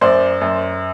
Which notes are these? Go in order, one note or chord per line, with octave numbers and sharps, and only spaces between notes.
F#2 C5 D5
F#2